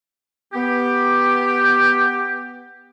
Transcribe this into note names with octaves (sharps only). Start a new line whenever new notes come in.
B3 G4